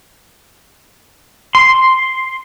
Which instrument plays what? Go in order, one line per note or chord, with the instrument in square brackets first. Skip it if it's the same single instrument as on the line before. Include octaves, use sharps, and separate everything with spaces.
[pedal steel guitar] C6